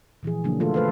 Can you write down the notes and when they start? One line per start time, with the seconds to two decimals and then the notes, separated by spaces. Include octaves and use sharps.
0.23 A#2 E3 F3 G#4
0.44 C#3 F3 F#3 A#3 D4
0.60 D#3 A3 F4 A4
0.74 A3 A4 B4 C5 F5